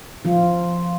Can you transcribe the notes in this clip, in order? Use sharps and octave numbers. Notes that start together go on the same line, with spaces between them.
F3 F4